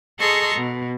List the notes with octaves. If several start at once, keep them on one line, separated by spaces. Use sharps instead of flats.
G#4 A4 D#5 A#5 C6 C#6
B2